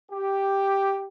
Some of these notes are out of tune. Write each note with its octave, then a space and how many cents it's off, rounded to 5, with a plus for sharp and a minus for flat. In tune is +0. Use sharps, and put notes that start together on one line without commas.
G4 +0